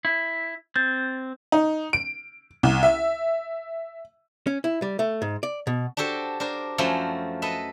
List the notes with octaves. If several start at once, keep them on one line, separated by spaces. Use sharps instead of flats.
E4
C4 G6 A6
D#4
D7
C2
E5
C#4
E4
G3
A3
G#2
D5
B2
D4 F#4 G4 A4 C5
D4 A#4 C5
F#2 F3 A3 F#4 G#5 C6
A4 B4 D#5 E5